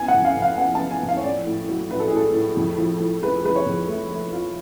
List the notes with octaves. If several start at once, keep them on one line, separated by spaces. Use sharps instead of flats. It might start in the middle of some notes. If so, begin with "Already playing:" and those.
Already playing: F#2 B3 G#5
F#5
F2
F5
F2
F5
B3 F#5
B3 A5
G#5
F2
F5
C#5
A2 D5
A2
F#3
A2 B4
A4
G#4
A2 A4
A2
F2
F3
F3
G#3 B4
G#3 B4
C#5
F2
A3
A3
F4